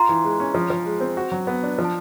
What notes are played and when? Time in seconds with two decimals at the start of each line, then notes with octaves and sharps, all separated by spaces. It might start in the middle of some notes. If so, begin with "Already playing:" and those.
Already playing: F4 A#5 C6
0.09 E3
0.24 G#3
0.40 C#4
0.55 F3
0.70 F3
0.85 G#3
1.00 C4
1.17 F#4
1.32 F#3
1.47 B3
1.63 D4
1.79 F3
1.84 A5